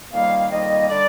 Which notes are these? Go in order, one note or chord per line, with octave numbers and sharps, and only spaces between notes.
F2 D#3 G3 A#3 F5
F2 D#3 G3 A#3 D#5
D3 G3 D5